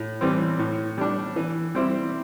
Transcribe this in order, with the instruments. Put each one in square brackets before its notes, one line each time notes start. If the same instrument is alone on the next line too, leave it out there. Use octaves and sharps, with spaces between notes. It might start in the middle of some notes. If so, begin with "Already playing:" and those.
Already playing: [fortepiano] A2
E3 G3 C4
A2
G3 D4
E3
G3 C4 E4